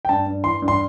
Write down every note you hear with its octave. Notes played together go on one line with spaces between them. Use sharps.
G5
G2 A5
G2
E3 C6
G2
C6